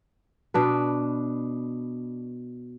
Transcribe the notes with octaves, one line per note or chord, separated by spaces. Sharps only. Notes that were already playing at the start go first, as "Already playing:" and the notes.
B2 D4 B4